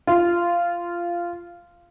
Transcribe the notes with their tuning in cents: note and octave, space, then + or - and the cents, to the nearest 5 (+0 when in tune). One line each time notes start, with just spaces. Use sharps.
F4 -15